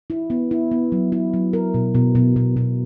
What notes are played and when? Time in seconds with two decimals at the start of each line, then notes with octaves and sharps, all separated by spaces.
0.10 E4
0.30 B3
0.51 E4
0.71 B3
0.92 F#3
1.12 E4
1.34 F#3
1.53 A#4
1.74 B2
1.95 B2
2.15 B2
2.36 B2
2.57 B2